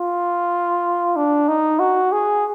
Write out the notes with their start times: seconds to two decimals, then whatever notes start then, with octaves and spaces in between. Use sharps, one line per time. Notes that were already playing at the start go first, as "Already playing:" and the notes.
Already playing: F4
1.16 D4
1.48 D#4
1.80 F#4
2.12 G#4